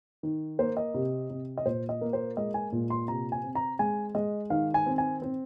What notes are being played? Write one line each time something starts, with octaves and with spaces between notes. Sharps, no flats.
D#3
A#3 C5
D#5
C3
C3
D#5
A#2 C5
D#5
A#3
C5
G#3 D#5
G#5
A#2
C6
C3 A#5
G#5
C4
A#5
G#3 G#5
G#3 D#5
D#3 F5
G#5
C4
G#5
C4